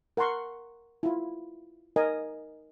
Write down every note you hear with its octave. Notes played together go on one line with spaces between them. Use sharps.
A#4 F#5 A#5 C6 C#6
E4 F4
D#4 A#4 D#5 G#5